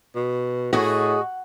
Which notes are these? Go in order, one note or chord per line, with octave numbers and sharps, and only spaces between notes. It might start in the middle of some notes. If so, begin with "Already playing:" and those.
B2
A2 F#4 G#4 D#5